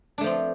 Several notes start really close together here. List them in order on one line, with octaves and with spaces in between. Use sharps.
D4 A3 F3 C4